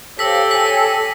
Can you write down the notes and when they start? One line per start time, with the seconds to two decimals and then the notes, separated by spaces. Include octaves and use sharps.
0.19 G4 A4 C5 C#5 F5 E6 A#6 B6
0.51 C#5 G5 G#5 B6